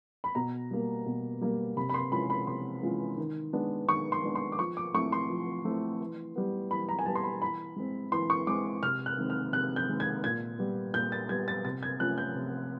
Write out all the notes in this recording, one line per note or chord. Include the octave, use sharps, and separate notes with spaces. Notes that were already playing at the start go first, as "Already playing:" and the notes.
B5
B2 A#5
G3 A#3
B2
G3 A#3
C3 B5
B5
C6
E3 G#3 C#4 F4 B5
B5
C3 C6
E3 G#3 C#4 F4
D#3
G#3 B3 D4
D#3 C#6
C6
G#3 B3 D4
C6
D6
F3 C#6
D6
A3 C4 E4 C#6
C6
F3
A3 C4 E4
E3
G3 B3
E3 B5
A#5
G#5
G3 B3 A5
C6
B5
E3 B5
G#3 C4
E3 C6
C#6
G#3 C4 D6
C3 F6
F#6
D#3 G#3 C4
F6
C3 F#6
G6
D#3 G#3 C4
G#6
A#2 G#6
G3 B3
A#2 G6
A6
G3 B3 G#6
A6
C3 A6
G#6
F3 A3 C#4 F4 F#6
G6
C3